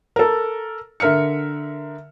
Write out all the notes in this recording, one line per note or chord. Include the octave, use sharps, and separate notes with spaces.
A4 A#4
D3 A#4 E5 F6 C#7